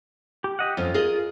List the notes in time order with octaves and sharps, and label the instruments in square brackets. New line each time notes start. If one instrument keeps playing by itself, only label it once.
[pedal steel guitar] G4
G4 D#5 F#5
[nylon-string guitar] F2 C#4 [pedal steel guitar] F4
[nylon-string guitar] G#4 A#4 D#5